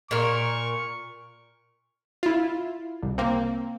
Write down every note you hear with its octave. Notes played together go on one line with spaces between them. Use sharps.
A#2 A#4 C#6
E4 F4
C2
A#3 C4